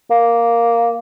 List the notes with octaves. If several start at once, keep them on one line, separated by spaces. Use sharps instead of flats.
A#3